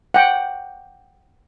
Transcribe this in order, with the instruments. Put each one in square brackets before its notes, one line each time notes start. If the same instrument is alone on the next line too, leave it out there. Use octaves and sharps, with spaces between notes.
[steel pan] F#5 G5